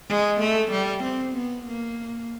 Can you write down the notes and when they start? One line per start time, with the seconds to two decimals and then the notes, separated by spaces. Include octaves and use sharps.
0.09 G#3
0.40 A3
0.72 G3
1.03 C4
1.35 B3
1.67 A#3